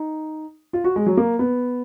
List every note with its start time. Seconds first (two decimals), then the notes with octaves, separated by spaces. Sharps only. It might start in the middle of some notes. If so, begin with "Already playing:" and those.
Already playing: D#4
0.73 F4
0.84 F#4
0.96 G#3
1.06 F#3
1.17 A#3
1.39 B3